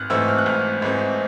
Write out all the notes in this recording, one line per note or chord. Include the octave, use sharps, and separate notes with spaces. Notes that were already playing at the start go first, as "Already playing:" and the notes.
Already playing: G#1 F6 F#6
G#2 E3 A3 C4 E6
F6
F#6
G#1 F6
G#2 E3 A3 C4